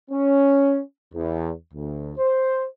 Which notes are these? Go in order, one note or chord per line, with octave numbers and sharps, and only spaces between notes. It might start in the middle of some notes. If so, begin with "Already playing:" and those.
C#4
E2
D2
C5